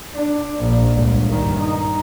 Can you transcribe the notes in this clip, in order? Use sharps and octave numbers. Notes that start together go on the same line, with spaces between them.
D4
A#1
G1 C#2
G2 D#3
D#4